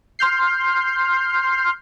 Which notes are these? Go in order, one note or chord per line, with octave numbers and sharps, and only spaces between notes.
C6 F6 G6 C7